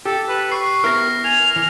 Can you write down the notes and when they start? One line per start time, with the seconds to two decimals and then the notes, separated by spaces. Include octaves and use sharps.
0.05 G4 A4
0.28 B4
0.52 C#6 C7
0.84 B3 E4 A#4 F6 A#6
1.24 G#5 F7
1.56 E3